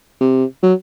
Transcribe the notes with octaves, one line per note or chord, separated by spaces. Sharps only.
C3
F#3